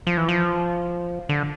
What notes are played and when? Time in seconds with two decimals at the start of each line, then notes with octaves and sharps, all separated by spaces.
0.07 F3
0.17 E3
0.28 F3
1.29 D3